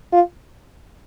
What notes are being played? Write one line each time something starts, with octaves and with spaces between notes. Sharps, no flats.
F4